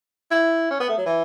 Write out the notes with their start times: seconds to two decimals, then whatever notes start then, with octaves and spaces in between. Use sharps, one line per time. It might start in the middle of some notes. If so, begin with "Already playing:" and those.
0.31 E4
0.71 C#4
0.80 B3
0.89 A3
0.98 F#3
1.06 E3